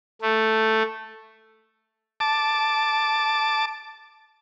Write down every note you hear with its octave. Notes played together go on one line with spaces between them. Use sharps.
A3
A5 D6